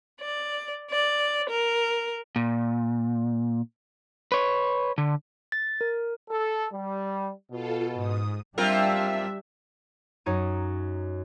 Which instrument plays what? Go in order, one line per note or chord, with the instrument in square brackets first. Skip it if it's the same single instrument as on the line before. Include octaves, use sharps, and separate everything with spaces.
[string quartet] D5
D5
A#4
[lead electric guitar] A#2
B4 C#5
D3
[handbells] A6
A#4
[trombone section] A4
G3
[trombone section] B2 [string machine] F4 A4
[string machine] G#2 D#6
[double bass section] G3 [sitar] C4 F4 A#4 [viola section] D4 E5
[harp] F#2 D#4 C#5 A#5 D#7